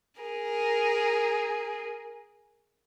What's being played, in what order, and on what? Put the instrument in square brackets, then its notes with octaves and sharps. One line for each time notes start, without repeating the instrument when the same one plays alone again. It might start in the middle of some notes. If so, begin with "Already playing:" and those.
[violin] G#4 A#4